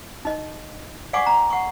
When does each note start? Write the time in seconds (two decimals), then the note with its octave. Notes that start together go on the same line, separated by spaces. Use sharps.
0.25 D#4 D#5
1.13 D5 F5 F#5 G#5 C#6 D6
1.26 A#5
1.50 F#5 C#6